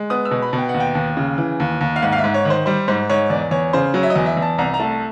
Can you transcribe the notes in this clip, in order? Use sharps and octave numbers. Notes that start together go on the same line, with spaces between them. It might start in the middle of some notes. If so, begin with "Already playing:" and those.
Already playing: G#3
B3 D#6
E6
B2
B5
B2
G5
F#5
D#2
G5
D#2
C#3
E3
D#2
D#2
F5
G#2 F#5
F5
E5
G#2
C#5
D#3
C5
G3 C5
G#2 C5
G#2 C#5
E2 D5
E2 C#5
C#3 C5
F#3 C#5
E5
D#5
E2
E5
E2
A5
C2 A#5
A#5
A3 A5